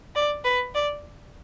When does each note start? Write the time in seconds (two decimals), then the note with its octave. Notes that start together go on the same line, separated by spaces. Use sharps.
0.15 D5
0.44 B4
0.75 D5